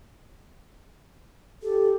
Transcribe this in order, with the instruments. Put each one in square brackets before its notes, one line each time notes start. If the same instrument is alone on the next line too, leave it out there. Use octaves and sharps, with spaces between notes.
[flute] G4 [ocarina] A4